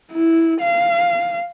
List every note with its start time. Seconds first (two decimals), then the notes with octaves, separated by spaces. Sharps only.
0.12 E4
0.61 F5